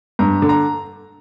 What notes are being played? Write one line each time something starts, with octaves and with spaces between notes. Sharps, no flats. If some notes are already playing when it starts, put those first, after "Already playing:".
G2 A#5
D3
A#5